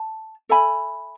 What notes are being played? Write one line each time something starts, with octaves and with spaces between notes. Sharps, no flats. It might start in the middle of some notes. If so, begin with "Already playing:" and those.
Already playing: A5
A4 E5 G#5 B5